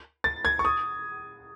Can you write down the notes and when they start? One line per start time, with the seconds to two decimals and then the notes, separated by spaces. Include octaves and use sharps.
0.24 A6
0.45 G#6
0.59 C#6
0.65 D#6